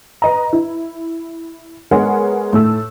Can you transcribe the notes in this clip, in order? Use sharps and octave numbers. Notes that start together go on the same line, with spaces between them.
B4 D#5 A#5
E4
G#3 B3 G#4 A#4 C#5 F#5
A2 A3 E6